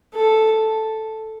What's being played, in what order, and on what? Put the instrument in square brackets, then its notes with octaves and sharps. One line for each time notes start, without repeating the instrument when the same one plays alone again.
[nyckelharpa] A4